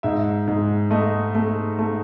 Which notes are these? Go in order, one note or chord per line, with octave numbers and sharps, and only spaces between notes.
G#2 E5
G#2
A3 D#5
A3
A3